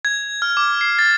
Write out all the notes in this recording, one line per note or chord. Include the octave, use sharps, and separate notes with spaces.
G#6
F6
D6
C7
A6